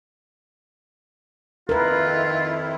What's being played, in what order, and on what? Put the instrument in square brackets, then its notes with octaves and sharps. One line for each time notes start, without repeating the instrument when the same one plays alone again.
[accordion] F2 D#3 E4 [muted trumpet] F4 [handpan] A#4 B4